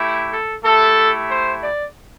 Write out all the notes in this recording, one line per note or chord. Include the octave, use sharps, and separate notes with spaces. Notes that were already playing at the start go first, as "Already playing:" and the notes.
Already playing: A3 E4 G4
A4
A3 E4 G4 A4
C5
D5